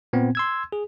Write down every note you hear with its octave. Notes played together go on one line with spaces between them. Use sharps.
A#2 B3 C4
C6 E6 G#6
G#4